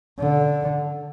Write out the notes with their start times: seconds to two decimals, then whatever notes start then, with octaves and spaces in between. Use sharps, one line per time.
0.19 D3